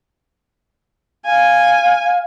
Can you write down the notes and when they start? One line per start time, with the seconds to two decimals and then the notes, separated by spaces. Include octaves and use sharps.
1.25 F5 G#5